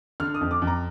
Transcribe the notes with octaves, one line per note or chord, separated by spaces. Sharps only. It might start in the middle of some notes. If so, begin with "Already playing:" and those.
D3 F6
D#6
F2
D6
F2
A#5